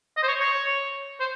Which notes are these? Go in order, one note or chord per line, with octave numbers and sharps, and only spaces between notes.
D#5
C5
C#5
C#5
C5